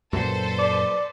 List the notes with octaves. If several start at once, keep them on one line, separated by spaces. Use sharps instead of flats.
F#2 A#2 F#3 A4 B4 C5
D5